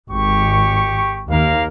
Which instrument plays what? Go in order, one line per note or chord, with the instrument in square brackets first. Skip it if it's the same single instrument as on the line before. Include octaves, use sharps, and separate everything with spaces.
[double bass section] G#1 [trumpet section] G4 C#6
[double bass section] D#2 [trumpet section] A#3 A#4 F5